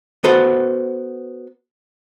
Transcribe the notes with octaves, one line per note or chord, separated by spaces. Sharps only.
B3 F#4 A4 B4 C5 F#5